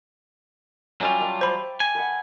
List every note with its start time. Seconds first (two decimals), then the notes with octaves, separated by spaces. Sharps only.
1.01 F#3 G3 C#4 F4 E5 G5
1.19 G5 A5 D6
1.41 C5 B5
1.80 G#5
1.95 B4 F#5